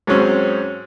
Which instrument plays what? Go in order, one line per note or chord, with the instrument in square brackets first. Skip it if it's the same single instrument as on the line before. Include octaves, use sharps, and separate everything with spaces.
[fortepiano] G#2 F#3 G#3 C4 C#4